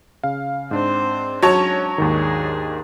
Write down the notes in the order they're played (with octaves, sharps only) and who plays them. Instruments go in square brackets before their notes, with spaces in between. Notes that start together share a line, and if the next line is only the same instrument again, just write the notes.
[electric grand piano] C#3 F5
[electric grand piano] G#2 D4 [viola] C4 C5
[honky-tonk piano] F#3 C#5 A5 [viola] C#4
[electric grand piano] D#2 G#2 D#3 [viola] D4 G#4